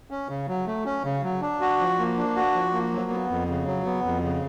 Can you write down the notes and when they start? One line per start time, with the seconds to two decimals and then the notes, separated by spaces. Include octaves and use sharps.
0.11 C#4
0.29 C#3
0.48 F#3
0.67 A3
0.85 C#4
1.04 C#3
1.23 F#3
1.41 D4
1.61 F#4
1.80 F3
1.99 A#3
2.18 D4
2.36 F#4
2.55 F3
2.73 A#3
2.93 F#3
3.10 B3
3.30 F2
3.49 C#3
3.67 F#3
3.85 B3
4.05 F2
4.23 C#3